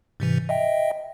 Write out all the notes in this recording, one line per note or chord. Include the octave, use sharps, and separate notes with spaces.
G#2 C3 E3
D#5 E5 G5